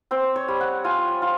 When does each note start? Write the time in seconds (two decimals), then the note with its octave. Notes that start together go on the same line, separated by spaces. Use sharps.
0.11 C4 C5
0.36 C#5
0.48 G3
0.61 F#5
0.84 F4 G#5
1.22 F4